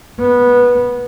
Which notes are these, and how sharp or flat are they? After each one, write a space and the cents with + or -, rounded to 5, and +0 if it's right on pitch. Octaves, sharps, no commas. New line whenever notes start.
B3 -15